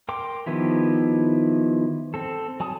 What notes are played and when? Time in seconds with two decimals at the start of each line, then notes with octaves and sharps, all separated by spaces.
0.09 A#4 G5 C6 D6
0.46 D#3 F3 B3 E4 G4
2.14 C4 A4
2.60 F#3 G#5 A5 D#6